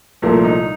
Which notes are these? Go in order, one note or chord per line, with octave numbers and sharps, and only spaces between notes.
C2 A#2 F3 A3 A#4
D#4